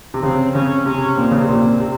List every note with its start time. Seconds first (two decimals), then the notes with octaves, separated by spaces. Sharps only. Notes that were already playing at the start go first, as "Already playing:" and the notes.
0.14 C3
0.23 C#3 C4
0.55 C#3 C#4
0.86 C3 C#4
1.17 A#2 C4
1.31 C#3
1.40 C3
1.48 A#2
1.80 C3